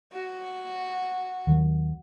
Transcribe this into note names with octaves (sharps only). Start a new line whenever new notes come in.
F#4
D#2 D#3 F#3